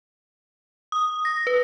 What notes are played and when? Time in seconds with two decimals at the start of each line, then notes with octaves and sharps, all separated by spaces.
0.92 D#6
1.25 A#6
1.47 B4